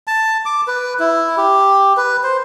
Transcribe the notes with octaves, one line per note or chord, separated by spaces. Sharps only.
A5
D6
B4
E4
G4
B4
C5